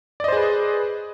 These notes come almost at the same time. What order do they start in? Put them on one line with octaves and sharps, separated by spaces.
D5 D#5 C5 G#4 B4